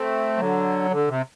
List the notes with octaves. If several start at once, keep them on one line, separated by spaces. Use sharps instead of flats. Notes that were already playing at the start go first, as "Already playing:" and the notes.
Already playing: A3 C4
D3 F#3
D3
C3